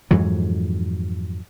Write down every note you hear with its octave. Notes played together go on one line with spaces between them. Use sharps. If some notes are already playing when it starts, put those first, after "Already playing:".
F2 G#2 E3 F#3